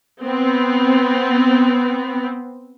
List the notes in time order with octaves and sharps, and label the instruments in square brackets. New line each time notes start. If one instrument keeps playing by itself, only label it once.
[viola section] B3 C4